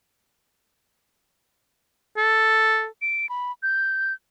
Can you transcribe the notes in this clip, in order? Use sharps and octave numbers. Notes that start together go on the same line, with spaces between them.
A4
D7
B5
G6